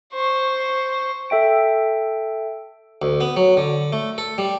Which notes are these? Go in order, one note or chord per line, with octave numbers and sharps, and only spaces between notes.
C5 C#6
A4 E5 G5 D7
D2
B3
F#3
D3
A3
A4
G3